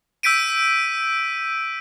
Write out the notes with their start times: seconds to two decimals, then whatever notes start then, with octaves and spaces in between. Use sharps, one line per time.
0.23 E6 G6 B6 D7 D#7